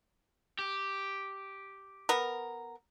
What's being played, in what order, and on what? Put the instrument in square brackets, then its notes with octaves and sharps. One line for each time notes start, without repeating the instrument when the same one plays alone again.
[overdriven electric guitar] G4
[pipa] B3 A#4